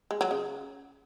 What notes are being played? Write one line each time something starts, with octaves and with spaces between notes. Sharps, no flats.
G#3
F#3
C#3